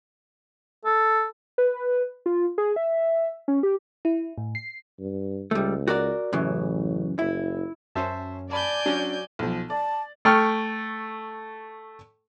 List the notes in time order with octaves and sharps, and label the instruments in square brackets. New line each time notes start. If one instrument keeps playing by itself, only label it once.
[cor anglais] A4
[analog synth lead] B4
F4
G#4
E5
C#4
G4
[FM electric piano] E4
A2
C7
[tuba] G2
[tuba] C#2 [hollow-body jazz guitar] G3 A3
[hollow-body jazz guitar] F#4 A#4 D5
[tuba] A1 [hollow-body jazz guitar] F#2 C#3 E3
[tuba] F#1 [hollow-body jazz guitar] E4
[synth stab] F#2 C#4 [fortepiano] C5 E5 A5
[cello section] D5 [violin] G#5 G6 [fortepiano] A5 B5
[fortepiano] F#3 [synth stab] C#4 D4
[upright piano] B1 F3
[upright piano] D5 [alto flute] A5
[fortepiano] A3 G5 C#6 F6